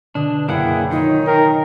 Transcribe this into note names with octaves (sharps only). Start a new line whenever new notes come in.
B2 D3 D4 D#6
F#1 A#3 E4 G#4 F#5 G5
D#3 D#4 F4 C#5
A#4 G5 G6